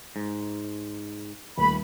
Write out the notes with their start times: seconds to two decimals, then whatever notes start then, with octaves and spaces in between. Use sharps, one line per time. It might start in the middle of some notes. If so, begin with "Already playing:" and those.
0.16 G#2
1.58 D#1 A3 B5